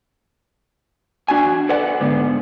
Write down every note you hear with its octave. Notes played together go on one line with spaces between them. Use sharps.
E2 D4 F#4 G#5
A4 B4 D5 F#5
G#2 D3 B3